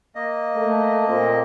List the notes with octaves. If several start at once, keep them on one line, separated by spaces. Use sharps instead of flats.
A#3 D#5
A3
A#2 C4